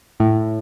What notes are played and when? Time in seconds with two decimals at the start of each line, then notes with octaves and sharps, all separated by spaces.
0.20 A2